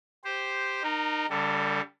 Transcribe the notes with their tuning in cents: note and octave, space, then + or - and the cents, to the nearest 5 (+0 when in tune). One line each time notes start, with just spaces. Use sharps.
G4 +0 C5 -5
D#4 -30 A#4 +0
D3 -40 G3 +10 A4 +35